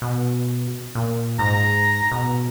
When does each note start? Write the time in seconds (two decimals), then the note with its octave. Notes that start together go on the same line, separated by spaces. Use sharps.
0.02 B2
0.95 A#2
1.39 G#2 A#5
2.12 B2